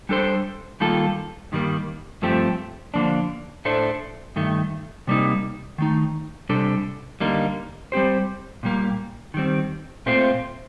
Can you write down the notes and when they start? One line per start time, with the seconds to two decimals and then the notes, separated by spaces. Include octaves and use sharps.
0.09 G3 D4 A4 C5
0.80 D#3 G3 A#3 F4 A4
1.52 G2 D#3 G3 A#3
2.22 G2 F3 A3 C4 G4
2.94 D3 F3 A#3 D4
3.65 A2 A3 D4 A4 C5
4.36 G2 D#3 A3
5.07 C3 G3 A#3 D#4
5.78 D#3 A3 D#4
6.49 C3 G3 D4 A4
7.20 D3 G3 A#3 D#4
7.92 G3 C4 G4 C5
8.63 A#2 G3 A#3
9.34 D#3 G3 C4
10.06 A#2 A3 C4 F4 C5